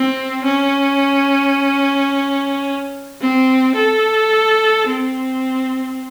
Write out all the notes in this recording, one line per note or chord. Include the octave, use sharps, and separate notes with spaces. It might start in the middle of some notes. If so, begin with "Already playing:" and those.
Already playing: C4
C#4
C4
A4
C4